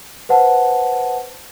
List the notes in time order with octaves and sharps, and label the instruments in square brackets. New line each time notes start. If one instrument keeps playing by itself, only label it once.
[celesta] B4 C5 F#5 A5